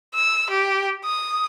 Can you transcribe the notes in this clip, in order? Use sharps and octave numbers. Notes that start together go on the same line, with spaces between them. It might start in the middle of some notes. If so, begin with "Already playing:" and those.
E6
G4
D#6